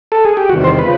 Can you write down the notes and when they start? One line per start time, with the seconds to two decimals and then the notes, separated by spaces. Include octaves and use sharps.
0.12 A4
0.25 G#4
0.37 G4
0.49 E2 C3 D#3 G3 F#4
0.64 C5
0.79 C#3 F3 B4